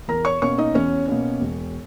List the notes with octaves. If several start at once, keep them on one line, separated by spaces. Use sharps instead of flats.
E2 A#4 A#5
C#5 C#6
B2 A#3 C#4 C#5 C#6
D#4 D#5
E2 C#4 C#5
B2 A#3 C#4
E1